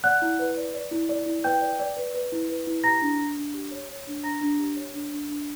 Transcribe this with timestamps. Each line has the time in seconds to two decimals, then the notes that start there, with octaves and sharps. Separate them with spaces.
0.04 D5 F#5 F#6
0.22 E4
0.39 B4
0.57 D5
0.74 D5
0.91 E4
1.09 D5
1.26 E4
1.44 B4 G5 G6
1.62 D5
1.79 D5
1.97 B4
2.14 B4
2.32 E4
2.49 B4
2.67 E4
2.84 G4 A#5 A#6
3.02 D4
3.19 D4
3.37 D4
3.54 G4
3.71 C#5
3.89 C#5
4.07 D4
4.24 D4 A#5 A#6
4.41 D4
4.59 G4
4.76 C#5
4.94 D4
5.12 D4
5.29 D4